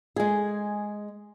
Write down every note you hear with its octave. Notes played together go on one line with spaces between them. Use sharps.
G#3 G#4